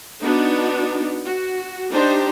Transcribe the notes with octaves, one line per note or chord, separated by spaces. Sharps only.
B3 D4 D#4 F#4
F#4
D4 D#4 G4 C5